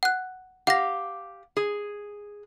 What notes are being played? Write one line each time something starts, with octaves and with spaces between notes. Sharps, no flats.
F#5 F#6
G4 F5 F#5 A#6
G#4